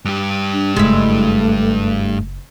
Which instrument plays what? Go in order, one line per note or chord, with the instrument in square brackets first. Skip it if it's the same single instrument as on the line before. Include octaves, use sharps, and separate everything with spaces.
[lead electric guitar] G2 G4
[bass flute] D4
[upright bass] F#1 [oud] G#3 E4 [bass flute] A3